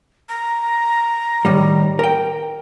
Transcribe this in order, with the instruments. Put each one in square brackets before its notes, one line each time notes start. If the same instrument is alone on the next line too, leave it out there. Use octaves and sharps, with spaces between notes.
[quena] A#5
[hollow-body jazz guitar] A2 D#3 G3
A#4 G5